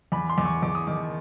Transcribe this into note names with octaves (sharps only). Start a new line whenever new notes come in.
E2 B5
C6
E2
C#6
E2 D6
D#6
D#3 D6